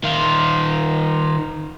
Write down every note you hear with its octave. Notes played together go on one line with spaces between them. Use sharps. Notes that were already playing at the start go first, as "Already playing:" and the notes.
D#3 F4